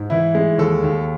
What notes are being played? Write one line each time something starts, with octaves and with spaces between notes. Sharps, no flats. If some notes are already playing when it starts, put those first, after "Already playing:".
Already playing: G#2
E3 E4
G#3
D#2 A4
D#2